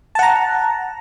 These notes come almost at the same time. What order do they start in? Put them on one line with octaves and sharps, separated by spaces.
A5 F#5 A#5